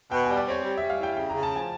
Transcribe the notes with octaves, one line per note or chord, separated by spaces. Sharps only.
B2 G5
G3 G#5
D5
C4 C#5
G3
G3 E5
F5
E4 G5
C#3 G5
C#3 A#5
A5
F3 G#5